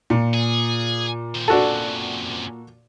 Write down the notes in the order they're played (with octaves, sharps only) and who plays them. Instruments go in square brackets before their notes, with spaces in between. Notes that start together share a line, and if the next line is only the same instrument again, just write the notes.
[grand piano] A#2
[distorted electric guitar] G#4
D#3 C5
[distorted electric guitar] F#2 C3 [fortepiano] D4 F#4 A4